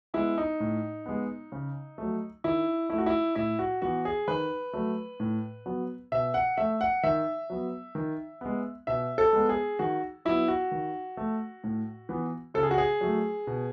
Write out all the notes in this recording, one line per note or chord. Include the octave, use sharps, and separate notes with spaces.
G#3 B3 E4
D#4
A2
G#3 B3
C#3
F#3 A3
D#3 E4
A3 E4
F#4
E4
A2 E4
F#4
E3 B3 F#4
G#4
D#3 B4
F#3 A3
A2
F#3 B3
B2 E5
F#5
A3 E5
F#5
D#3 E5
F#3 B3
D#3
G#3 B3
B2 E5
A4
G#3 B3
G#4
D#3 F#4
F#3 B3 E4
F#4
D#3
A3
A2
E3 B3
C#3 A4
G#4
F#4
G#4
F#3 A3
B2